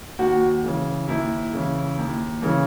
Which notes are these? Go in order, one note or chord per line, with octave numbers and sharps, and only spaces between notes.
D#2 F#4
C#3 E3
D#2 E4
C#3 E3
D#2
C#3 E3